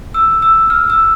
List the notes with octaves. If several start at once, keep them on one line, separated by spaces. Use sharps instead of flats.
E6
E6
F6
E6